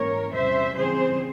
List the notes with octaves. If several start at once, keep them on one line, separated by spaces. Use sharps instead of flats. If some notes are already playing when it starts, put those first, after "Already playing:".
Already playing: G#2 E3 A#3 C#4 A#4 C#5
E2 C3 G3 C#4 C5 E5
C#3 E3 G3 C4 G#4 C5